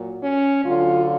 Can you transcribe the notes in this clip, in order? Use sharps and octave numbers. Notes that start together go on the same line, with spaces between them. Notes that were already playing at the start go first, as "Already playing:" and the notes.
Already playing: A#2 F#3
C#4
D2 D3 F#3 F4